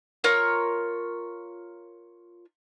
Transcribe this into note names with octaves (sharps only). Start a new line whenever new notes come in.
F4 A#4 C#5